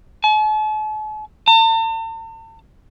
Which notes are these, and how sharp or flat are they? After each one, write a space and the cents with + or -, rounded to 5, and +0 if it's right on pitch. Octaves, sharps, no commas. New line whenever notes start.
A5 -45
A5 +45